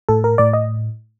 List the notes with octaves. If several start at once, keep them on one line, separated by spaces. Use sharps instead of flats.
A2 A4
A#4
A2 D5
D#5